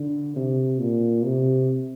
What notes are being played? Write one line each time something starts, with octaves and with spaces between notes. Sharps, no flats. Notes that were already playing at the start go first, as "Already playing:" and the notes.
Already playing: D3
C3
A#2
C3